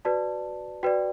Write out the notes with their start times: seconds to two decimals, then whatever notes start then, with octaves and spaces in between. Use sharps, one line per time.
0.05 F#4 B4 D5 A5
0.83 F#4 B4 D5 G5